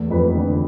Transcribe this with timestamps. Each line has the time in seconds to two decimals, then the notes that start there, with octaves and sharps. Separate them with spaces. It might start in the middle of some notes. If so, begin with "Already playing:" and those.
Already playing: E2 A3
0.10 F2 B4
0.35 D3